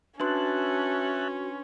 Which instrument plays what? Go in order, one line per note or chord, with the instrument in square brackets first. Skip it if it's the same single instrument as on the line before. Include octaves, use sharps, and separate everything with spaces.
[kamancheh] C#4 [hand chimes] D4 B4 C6 [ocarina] F#4 [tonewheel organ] E5 A5 F#6